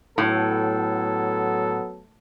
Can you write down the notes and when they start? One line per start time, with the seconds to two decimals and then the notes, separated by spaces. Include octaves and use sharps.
0.18 A2 F#3 B3 A4